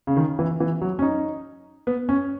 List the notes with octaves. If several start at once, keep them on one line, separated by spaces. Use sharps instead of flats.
C#3
D#3
E3
E3
F#3
C#4
D#4
B3
C#4